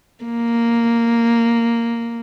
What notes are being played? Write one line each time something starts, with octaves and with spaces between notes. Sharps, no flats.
A#3